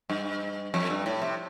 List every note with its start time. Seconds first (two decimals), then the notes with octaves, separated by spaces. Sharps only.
0.10 G2
0.74 F2
0.90 G2
1.06 A2
1.22 C3